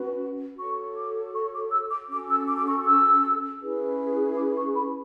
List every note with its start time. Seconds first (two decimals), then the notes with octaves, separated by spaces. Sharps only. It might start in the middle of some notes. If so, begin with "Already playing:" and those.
Already playing: C#4 F#4 B4
0.57 F#4 A4 C#5 C#6
0.96 D6
1.33 C#6
1.53 D6
1.72 E6
1.90 D6
2.10 C#4 F#4 A4 D6
2.29 E6
2.48 D6
2.58 D6
2.66 C#6
2.86 E6
3.61 C#4 E4 G#4 B4
4.37 D6
4.56 C#6
4.76 B5